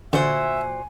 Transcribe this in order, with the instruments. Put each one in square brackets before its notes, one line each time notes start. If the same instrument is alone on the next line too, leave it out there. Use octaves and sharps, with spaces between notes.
[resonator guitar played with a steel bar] A#2 F#4 C5 [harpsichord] D3 [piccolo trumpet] E5 [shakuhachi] G#5